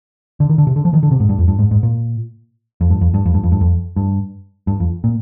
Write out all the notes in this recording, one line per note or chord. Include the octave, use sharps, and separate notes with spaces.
D3
D#3
D3
C3
D3
F3
D#3
D3
C3
G#2
G2
F2
G2
G#2
G#2
A#2
F2
G2
F2
G2
F2
G2
F2
G2
F2
G2
G2
F2
A#2